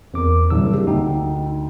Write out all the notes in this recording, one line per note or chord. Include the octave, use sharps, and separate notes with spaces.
E2 C4 A#4 D6
F#1 C2 D4 E6
G4
D2 D#4 G5